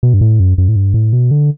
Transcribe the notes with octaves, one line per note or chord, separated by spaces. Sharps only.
B2
G2
A2
F#2
F#2
A2
G2
A2
B2
D3